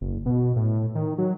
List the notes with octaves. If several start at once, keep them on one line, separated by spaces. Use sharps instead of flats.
F#1
B2
A2
D#3
F#3